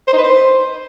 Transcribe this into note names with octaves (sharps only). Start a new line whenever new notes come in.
C5
D#4
B4
C5